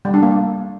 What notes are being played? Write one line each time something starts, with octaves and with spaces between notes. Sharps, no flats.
G3
D4
A#3